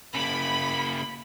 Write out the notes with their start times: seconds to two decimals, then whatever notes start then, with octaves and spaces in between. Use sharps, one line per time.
0.15 C#3 A#3 B5